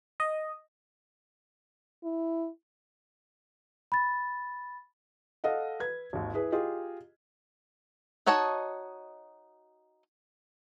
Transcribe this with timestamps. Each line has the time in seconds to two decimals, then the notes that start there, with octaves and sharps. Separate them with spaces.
0.20 D#5
2.04 E4
3.92 B5 A6
5.44 A4 D#5 F5 F#5
5.80 B4 G#6
6.13 G#1 D#2
6.34 E4 G#4 B4
6.52 F4 G4 G#4 D#5
8.26 D#4 F#4 C#5 D#5 A5